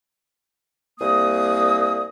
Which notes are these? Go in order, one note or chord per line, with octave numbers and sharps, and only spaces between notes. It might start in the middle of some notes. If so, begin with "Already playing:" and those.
C2 A#3 D#6